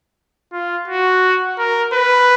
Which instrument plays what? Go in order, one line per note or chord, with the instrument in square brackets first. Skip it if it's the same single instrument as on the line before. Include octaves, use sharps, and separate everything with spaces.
[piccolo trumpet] F4
F#4
A#4
B4